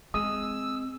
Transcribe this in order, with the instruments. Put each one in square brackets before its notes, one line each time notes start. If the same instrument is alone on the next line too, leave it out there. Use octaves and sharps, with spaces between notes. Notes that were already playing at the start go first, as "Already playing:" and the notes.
[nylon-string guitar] G#3 [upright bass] C4 [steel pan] D#6 [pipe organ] E6